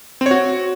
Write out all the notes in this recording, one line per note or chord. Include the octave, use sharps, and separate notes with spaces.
C4
C#5
F#4